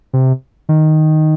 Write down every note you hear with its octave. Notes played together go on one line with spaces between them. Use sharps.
C3
D#3